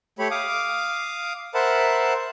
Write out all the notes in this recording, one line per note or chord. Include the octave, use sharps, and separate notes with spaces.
A3 G4 C#5 B5
F5 D6 D#6
A#4 C5 E5 F#5 A5 B5